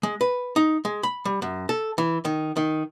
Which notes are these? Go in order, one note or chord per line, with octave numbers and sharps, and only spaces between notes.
G#3
B4
D#4
G#3
B5
G3
F#2
A4
E3
D#3
D#3